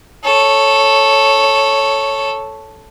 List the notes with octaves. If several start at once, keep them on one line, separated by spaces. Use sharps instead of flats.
A4 C#5